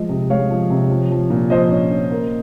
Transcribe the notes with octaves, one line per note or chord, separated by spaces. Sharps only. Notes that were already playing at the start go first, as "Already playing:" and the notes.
Already playing: F3 G#3 D#5
C3
G#3 C#5 F5
F3
C3
F3
F3
A#2
F3 C5 D#5
C#4
C#4
A#3